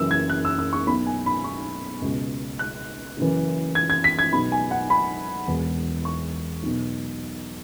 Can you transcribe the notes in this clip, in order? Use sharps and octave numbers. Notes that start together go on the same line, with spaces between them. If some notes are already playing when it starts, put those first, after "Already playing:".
Already playing: F#1 F#2 E3 E6
G#6
F#6
E6
E6
C#6
B1 B2 B5
G#5
B5
C#6
C#2 B2
F#6
F#1 F#2 C#3 E3
G#6
G#6
B6
G#6
B1 B2 B5
G#5
F#5
B5
E1 E2 E3
C#6
B1 B2